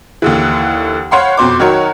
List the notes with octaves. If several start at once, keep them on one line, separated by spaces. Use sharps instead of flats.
D#2 D3 E3
C5 C#5 F5 F#5 B5 C6
F2 B2 C5 D6
D#3 F#3 F#4 A#4 C#5